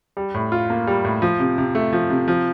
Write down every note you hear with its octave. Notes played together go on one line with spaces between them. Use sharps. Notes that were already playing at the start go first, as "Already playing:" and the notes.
G3
A2
F4
A#3
G3
A2
F3
C3
C3
A3
F3
C3
F3